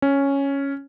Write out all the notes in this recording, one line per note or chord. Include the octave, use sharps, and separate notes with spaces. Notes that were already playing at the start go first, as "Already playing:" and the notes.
C#4